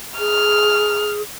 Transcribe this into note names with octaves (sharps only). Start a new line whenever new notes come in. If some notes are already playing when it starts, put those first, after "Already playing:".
G#4 F6